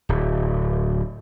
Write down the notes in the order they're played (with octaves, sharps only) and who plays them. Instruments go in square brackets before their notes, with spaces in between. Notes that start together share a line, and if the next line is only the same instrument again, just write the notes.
[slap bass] D1